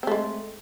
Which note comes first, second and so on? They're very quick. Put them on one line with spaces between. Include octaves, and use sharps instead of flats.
C4 A3 G#3